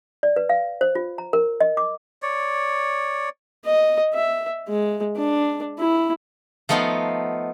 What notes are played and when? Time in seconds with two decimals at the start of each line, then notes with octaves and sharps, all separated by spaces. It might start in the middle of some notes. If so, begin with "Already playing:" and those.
0.23 D5
0.36 B4
0.49 F5
0.81 C5
0.95 F4
1.18 A#5
1.33 A#4
1.60 D#5
1.77 D6
2.22 C#5 D5
3.65 D#5
4.14 E5
4.68 G#3
5.16 D4
5.79 E4
6.69 F3 A3 B3 D#4 F5 F#5